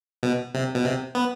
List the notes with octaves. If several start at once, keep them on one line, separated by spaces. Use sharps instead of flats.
B2
C3
B2
C3
B3